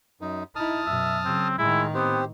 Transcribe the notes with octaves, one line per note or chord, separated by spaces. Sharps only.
F#2 D#4
D#4 E4 A5 D#6 F6
F#2 B2 E5
C#3 F#3 C4
A2 D#3 G#3 E4
B3 C4 G4 C5